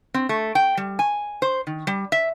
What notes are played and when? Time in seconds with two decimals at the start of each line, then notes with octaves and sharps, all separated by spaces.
0.14 C4
0.29 A3
0.55 G5
0.77 G3
0.99 G#5
1.42 C5
1.67 D#3
1.87 G3
2.12 E5